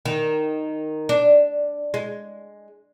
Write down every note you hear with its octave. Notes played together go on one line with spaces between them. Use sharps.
D#3
D4
G#3